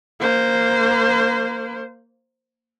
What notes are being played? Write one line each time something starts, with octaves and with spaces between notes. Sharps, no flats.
A#3 C5